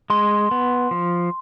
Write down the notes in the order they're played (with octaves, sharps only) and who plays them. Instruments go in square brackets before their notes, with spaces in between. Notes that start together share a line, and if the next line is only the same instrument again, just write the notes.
[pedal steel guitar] G#3 [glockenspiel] C6
[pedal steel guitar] B3
F3